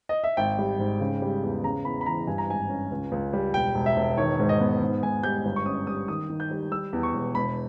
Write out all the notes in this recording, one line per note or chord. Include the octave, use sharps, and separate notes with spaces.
D#5
E5
G#1 G5
G3
G#2
C#3
G3
E2
C#3 A#5
E2 B5
B5
E3 A#5
G2 G#5
A#5
G#1 G#5
C#4
C#2
C#2
G3
E1 G5
E1
E5
E1
D#3 C#5
G#2
D#5
B3
G#2
G#2 G#5
G3 G6
G1
C#6
C#4 D#6
G3 D#6
D#3 D#6
D#3
G6
G3
G3 E6
E2
C#6
E1
E1 B5